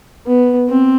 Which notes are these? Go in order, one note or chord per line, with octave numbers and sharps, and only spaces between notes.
B3
C4